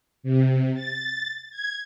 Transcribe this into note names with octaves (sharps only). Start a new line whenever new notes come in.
C3
A6
G#6